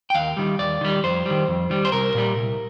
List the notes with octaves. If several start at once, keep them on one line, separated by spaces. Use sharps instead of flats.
G5
D#2 F5
D#3 G3
D#2 D5
D#3 G3
F2 C5
D#3 G3
F2
D#3 G3
C5
C2 A#4
A#2 G3
C2